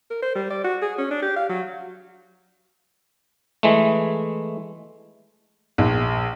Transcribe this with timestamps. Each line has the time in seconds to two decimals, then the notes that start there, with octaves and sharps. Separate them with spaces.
0.11 A#4
0.22 C5
0.35 G3
0.51 D5
0.64 F#4
0.82 G#4
0.98 C#4
1.10 D4
1.22 G4
1.36 F5
1.49 F#3
3.63 E3 G#3 A3
5.78 A#1